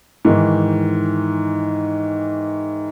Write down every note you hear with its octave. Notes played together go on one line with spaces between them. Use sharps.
G#2 D#3 E3